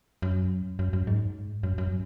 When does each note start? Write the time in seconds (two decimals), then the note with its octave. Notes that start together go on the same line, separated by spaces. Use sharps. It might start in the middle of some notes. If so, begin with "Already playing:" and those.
0.22 F#2
0.79 F#2
0.93 F#2
1.07 G#2
1.63 F#2
1.78 F#2